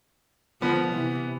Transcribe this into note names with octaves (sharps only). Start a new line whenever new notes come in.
D3 F3 B3
C3 E3